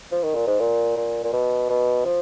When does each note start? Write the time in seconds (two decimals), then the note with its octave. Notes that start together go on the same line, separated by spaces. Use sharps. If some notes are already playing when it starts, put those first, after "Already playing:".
0.12 F3
0.23 D#3
0.35 A#2
0.47 G#2
0.60 A#2
0.97 A#2
1.24 A#2
1.33 B2
1.69 B2
2.05 F3